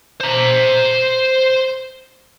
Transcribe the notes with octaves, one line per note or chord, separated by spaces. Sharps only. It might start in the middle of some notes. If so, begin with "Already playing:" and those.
C5 A#5